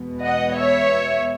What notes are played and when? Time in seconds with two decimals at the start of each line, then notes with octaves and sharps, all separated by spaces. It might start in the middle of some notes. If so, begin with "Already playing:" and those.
Already playing: E2 B2 G#3 B3
0.24 D#5 F#5
0.58 C#5 E5